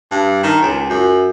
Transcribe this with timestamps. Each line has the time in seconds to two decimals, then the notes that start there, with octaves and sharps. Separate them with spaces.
0.11 G2
0.43 D#3
0.62 C#2
0.89 F#2